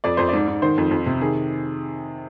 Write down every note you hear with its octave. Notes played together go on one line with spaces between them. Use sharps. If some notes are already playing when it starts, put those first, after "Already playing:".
F2 D5
F2 C5
G#2 D5
G#2
D#3 C5
F2
F2
C3
D#3 G#4